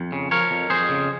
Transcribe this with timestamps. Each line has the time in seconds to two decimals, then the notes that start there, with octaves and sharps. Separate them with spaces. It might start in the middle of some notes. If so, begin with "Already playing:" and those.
Already playing: F2
0.12 C#3
0.31 F3 A#4 C#5
0.51 F2
0.70 F2 G#4 C5
0.89 C#3